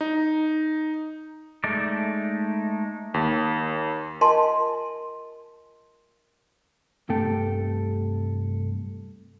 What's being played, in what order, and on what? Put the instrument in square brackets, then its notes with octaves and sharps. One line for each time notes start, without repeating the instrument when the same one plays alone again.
[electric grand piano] D#4
[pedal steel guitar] G#3 A3 D#4 D5
[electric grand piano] D#2
[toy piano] F4 A#4 D#5 G#5 A5 C6
[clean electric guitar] C2 G2 C3 A3 A4 G5